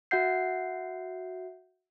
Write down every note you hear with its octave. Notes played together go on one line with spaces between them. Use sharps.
F#4 E5 F#5 G6 C7